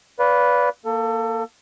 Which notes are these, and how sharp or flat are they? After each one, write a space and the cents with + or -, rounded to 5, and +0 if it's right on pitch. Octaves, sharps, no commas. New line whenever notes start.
B4 +0 D5 -25 F5 +10
A#3 +0 A4 +25